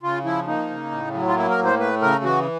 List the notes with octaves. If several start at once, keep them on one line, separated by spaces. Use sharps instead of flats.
C#3 F4
F3 E4
A#3 D#4
C#3
A2
F#3
F4
A#3 E4
A#4
A2
C5
A3 B4
C#3 A#4
E3 F#4